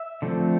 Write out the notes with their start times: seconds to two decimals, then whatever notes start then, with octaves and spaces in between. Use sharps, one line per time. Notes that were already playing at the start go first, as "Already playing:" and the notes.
Already playing: E5
0.22 D3 F3 A3 C4